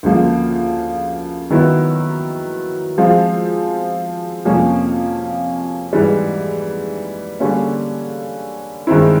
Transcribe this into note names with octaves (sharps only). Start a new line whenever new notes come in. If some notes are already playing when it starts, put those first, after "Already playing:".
D2 C#3 F3 A#3
D#3 F#3 B3 E4
F3 G#3 C4 F4
F2 C3 F3 A#3 C#4
G#2 E3 G3
D3 G3 A#3 C#4
G2 D#3 G#3 C4 E4